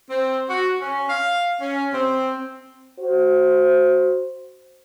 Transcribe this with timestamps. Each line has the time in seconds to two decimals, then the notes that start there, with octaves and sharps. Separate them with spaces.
0.10 C4
0.48 F#4
0.80 C#4
1.09 F5
1.60 C#4
1.94 C4
3.00 F#4 C5